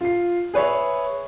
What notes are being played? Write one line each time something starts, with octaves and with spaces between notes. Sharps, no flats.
F4 C7
G#4 B4 C#5 E5